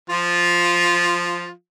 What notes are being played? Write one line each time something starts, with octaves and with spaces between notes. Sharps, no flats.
F3 F4